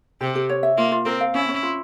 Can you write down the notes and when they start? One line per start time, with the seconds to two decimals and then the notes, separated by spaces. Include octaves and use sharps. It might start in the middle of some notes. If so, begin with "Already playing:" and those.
0.21 C3 G4
0.35 G4
0.49 C#5
0.63 E5
0.77 A#3 F4
0.92 F4
1.05 C4 A#4
1.21 F5
1.35 C#4 E4
1.49 C#4
1.63 F4